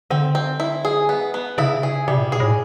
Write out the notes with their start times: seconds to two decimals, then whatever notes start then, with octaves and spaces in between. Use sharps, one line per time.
0.10 D3 C4
0.35 C4
0.60 E4
0.85 G#4
1.09 B3
1.34 B3
1.58 C#3 E4
1.83 G#4
2.08 C3 G3
2.18 A#2
2.24 B2
2.32 G#4
2.40 A2